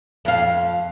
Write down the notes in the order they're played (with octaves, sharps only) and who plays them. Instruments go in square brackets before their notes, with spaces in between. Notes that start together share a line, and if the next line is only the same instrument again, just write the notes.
[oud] F2 F5